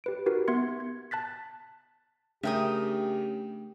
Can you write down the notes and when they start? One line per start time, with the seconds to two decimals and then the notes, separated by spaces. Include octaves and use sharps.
0.04 G4 B4 D7
0.26 D#4 F#4 G4 A#4 B4
0.48 B3 E5 C6 G#6 C#7
0.80 G#6
1.11 A5 F#6 A6 B6
2.43 C#3 A3 D4 G4 A#4 E5 G5 D#6